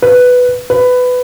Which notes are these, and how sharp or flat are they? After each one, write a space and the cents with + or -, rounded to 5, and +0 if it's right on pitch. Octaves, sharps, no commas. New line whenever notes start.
B4 +5
B4 +15